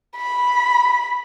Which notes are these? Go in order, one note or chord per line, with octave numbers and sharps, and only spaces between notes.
B5